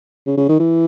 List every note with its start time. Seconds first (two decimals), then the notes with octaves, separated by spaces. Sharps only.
0.26 C#3
0.37 C#3
0.49 D#3
0.59 E3